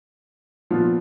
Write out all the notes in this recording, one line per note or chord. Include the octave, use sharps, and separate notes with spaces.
A#2 F3 B3 F4